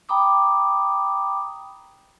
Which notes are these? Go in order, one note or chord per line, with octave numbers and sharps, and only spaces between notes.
G5 A#5 B5 D6 D#6